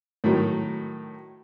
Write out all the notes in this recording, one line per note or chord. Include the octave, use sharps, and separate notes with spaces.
A2 D#3 F#3